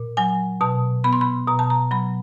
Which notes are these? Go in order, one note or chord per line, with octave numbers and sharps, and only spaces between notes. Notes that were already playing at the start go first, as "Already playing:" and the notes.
Already playing: A#2
F#3 G#5
B2 A5
B3 B5
C6
B5
B2 A#5
A5
A#5
F#3 B5